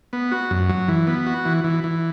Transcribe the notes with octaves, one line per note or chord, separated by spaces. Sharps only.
B3
F#4
F#2
F#3
E3
B3
F#4
E3
E3
E3